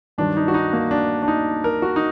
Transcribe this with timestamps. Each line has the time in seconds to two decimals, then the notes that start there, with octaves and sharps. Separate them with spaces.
0.18 G2 D#3 F#3 D4
0.37 D#4
0.48 F#4
0.54 D#4
0.73 A#3
0.91 D4
1.23 D4
1.28 D#4
1.64 A#4
1.82 F#4
1.96 D#4